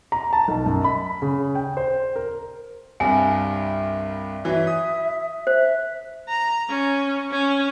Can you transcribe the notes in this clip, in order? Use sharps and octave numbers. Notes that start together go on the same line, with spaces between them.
A#5
A5
B1
F#2
B5
C#3
G5
C5
A#4
C2 G2 G#5
E3 F#3 E5
D#6
C5 E5
A#5
C#4
C#4